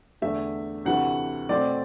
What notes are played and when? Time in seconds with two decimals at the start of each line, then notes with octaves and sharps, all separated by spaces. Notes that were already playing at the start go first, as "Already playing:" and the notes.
0.22 E2 D3 A3 E5
0.85 D2 C3 E3 A3 F#5
1.49 B2 A3 C4 D5